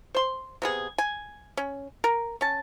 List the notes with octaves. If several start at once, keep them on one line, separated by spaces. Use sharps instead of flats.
C5 C6
C3 B3 G#4
G#5
C#4
A#4
C#4 A5